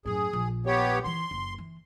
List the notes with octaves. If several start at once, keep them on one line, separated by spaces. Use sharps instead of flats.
F#2 A2 G#4
A#1
B3 G4 C#5
D#3 E3 C6
F#1
E3